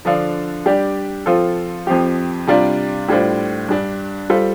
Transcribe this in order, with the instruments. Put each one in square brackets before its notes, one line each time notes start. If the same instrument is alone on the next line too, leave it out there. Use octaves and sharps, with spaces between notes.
[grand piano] D3 F3 D4 A4 F5
G3 D4 G4 D5
F3 C4 F4 A4
F2 F3 C4 G4
C3 G3 D4 F4 D5
A2 G3 D4 F4 C5
G2 G3 D4
G3 F4 A4 C5